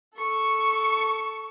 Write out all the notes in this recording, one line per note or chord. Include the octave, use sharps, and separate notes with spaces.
A4 C#6